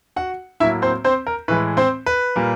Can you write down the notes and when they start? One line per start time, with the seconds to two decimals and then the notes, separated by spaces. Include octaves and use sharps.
0.16 F#4 F#5
0.60 A2 F#3 A#3 E4 E5
0.82 C4 C5
1.04 C4 C5
1.27 A#4
1.48 A2 E3 G#3 B4
1.77 C4 C5
2.06 B4
2.36 A#2 G3 A#3